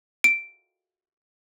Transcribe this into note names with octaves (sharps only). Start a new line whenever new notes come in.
D7